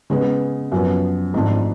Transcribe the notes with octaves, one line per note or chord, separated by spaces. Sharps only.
C#3 G#3 B3
F#2 F3 B3
G#1 G#2 F3 A3 D4